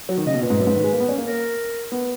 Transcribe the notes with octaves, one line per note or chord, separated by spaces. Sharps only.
F#3
D#3
C#3 D#5
B2
A#2 B4
G#2
F#2
G#2
D#3
G#3
A#3
B3
C#4
A#3
A#4
B3